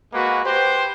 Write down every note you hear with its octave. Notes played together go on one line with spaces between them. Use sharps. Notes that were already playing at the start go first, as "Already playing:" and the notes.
G#3 A#3 F#4 B4
G4 B4 C5